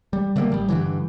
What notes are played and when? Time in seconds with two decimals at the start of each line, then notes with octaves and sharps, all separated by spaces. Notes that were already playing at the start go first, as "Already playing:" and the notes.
0.13 G3
0.36 D3 G3 A3 A#3
0.52 A1 G3
0.68 G2 D3 E3